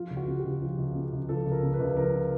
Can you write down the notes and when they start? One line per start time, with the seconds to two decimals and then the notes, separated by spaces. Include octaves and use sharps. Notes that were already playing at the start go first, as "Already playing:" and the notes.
Already playing: F3 F4
0.11 C#2
0.17 F#4
0.28 C#3
0.39 G4
0.44 C#2
0.62 F3
0.79 C#2
0.95 C#3
1.13 C#2
1.29 F3 A4
1.46 C#2
1.51 A#4
1.63 C#3
1.74 B4
1.80 C#2
1.97 F3 A#4